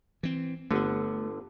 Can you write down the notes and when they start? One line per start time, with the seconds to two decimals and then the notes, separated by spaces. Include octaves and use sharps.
0.23 E3 C4
0.71 G1 D3 A3 B3